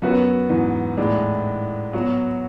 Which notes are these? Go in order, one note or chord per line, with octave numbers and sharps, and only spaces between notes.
F#2 B3 F#4 B4
E2 G#2
A2 G#3 D4
F#3 B3 F#4